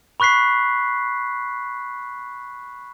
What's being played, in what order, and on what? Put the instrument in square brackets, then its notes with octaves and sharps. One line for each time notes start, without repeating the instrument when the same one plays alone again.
[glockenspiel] B5 C#6 F#6 B6 C7